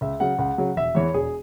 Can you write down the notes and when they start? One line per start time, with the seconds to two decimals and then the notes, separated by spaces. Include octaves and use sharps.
0.01 C#2 E5
0.20 C#3 F#3 F#5
0.39 C#2 F#5
0.58 C#3 F#3
0.77 E1 E5
0.95 E2 E3 C#5
1.14 E1 G#4